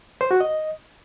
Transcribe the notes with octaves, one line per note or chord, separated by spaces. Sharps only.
C5
F#4
D#5